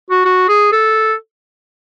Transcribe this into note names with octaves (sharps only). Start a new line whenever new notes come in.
F#4
F#4
G#4
A4